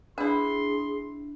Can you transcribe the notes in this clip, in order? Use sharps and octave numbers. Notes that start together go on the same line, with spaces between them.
D4 E4 G#4 B4 C6